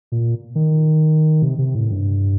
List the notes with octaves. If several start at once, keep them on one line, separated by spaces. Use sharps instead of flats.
A#2
D#3
C3
C3
A2
G2